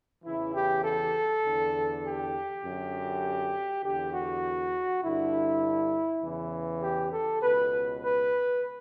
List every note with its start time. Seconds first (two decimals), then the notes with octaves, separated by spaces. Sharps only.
0.24 E2 C#3 E3 E4
0.54 G4
0.84 A4
1.44 E2 D3
2.04 G4
2.64 F#2 D3
3.83 E2 D3 G4
4.13 F#4
5.02 G2 D3 E4
6.22 E2 C#3 E3
6.82 G4
7.12 A4
7.41 C#2 B2 B4
8.01 B4